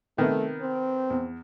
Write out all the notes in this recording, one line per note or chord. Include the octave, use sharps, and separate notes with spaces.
C3 D#3 A3 B3
C4
E2